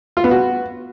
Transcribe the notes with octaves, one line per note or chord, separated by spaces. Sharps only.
F4
B3
F#4